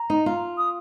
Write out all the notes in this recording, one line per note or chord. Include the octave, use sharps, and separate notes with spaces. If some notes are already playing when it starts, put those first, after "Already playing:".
Already playing: A#5
D#4
F4
D#6